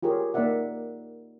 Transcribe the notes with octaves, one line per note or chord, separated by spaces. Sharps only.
F4 G4 G#4 A#4 C#5
A#3 D#4 A#4 D5 E5 F#5